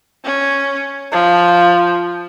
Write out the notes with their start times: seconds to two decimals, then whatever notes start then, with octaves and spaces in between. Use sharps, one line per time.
0.25 C#4
1.12 F3